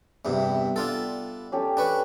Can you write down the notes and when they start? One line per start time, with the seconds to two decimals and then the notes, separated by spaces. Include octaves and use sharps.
0.25 E2 G2 C3 G3 B3 E5
0.76 D4 F4 A4
1.52 C#4 G4 A4
1.77 D4 B4 C#6